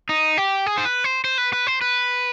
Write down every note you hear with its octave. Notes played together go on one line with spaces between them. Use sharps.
D#4
G4
G#4
C5
B4
C5
C5
B4
B4
C5
B4